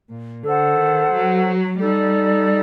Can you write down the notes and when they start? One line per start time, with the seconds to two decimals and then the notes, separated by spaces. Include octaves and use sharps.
0.10 A#2
0.43 D3 A4 C5 F#5
0.77 D#3
1.12 F#3
1.79 G3 D#4 A4 D5